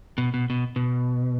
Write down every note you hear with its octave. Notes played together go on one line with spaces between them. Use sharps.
B2
B2
B2
B2